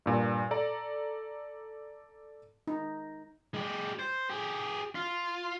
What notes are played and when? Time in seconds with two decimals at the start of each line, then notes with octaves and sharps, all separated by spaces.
0.06 G2 A#2
0.51 A4 D5 A#5
2.68 D#4
3.54 G#3 G4
3.99 C5
4.29 G4 G#4
4.95 F4